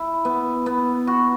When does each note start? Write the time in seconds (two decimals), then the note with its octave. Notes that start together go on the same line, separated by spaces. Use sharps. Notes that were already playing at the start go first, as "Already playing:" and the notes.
Already playing: E4
0.25 B3
0.66 B3
1.07 F#4